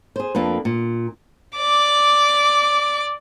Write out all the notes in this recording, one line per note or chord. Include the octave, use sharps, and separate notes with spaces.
G#4 C5
F2 A#3 D4 B4
A#2
D5 D6